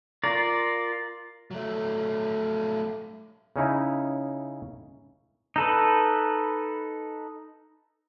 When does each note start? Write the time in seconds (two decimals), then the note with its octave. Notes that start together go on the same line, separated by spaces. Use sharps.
0.24 F4 A#4 D5
1.51 F#3 A3
3.56 C#3 C#4 D#4 E4
5.56 D#4 A4 B4